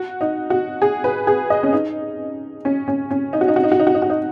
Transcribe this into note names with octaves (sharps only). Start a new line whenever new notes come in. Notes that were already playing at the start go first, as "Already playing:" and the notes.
Already playing: F#4
D#4
F#4
G#4
B4
G#4
D#5
C#4
D#4
C#4
C#4
C#4
D#4
F#4
D#4
F#4
D#4
F#4
D#4
F#4
D#4
F#4
D#4